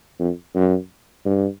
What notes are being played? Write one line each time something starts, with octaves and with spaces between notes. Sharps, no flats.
F2
F#2
G2